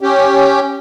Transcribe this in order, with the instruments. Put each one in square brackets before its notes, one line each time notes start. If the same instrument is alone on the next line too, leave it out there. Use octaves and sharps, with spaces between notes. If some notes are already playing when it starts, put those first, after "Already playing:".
[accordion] C#4 G4